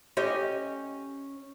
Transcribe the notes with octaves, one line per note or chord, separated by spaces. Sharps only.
C#4 G4 D#5